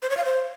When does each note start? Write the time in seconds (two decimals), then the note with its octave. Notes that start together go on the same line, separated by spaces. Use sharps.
0.02 C5
0.10 C#5
0.17 F5
0.25 C5